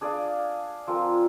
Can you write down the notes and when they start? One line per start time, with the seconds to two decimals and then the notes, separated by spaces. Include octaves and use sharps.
0.01 D4 G#4 D5 F5
0.87 F3 C4 F4 A#4